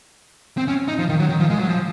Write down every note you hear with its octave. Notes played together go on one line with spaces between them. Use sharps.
C4
C#4
D#4
F3
D#3
F#3
D#3
F3
G#3
F#3
F3